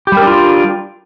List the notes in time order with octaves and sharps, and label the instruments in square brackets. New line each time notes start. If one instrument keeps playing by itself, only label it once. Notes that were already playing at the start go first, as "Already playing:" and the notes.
[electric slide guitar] G4
G3
A#4
D4
F4